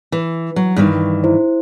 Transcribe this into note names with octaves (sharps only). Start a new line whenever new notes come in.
E3
F#3
G2 D#3 E3
E4 C5